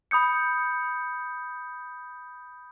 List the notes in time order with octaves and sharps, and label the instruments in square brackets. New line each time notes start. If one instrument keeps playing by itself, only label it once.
[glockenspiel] B5 D#6 G6 C#7